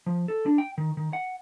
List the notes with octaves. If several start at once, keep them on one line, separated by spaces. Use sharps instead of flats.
F3
A4
D4
G5
D#3
D#3
F#5